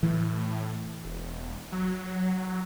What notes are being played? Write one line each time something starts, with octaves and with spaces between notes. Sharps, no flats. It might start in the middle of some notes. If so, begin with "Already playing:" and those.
A2 E3
E1
F#3